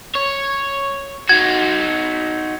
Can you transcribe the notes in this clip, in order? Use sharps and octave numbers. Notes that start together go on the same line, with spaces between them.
C#5
D#4 F#4 G#6